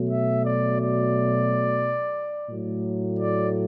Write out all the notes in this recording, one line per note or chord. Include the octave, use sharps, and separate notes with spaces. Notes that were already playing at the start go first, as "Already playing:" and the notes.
Already playing: B2 F#3 A3
E5
D5
D5
A2 F#3 A3
D5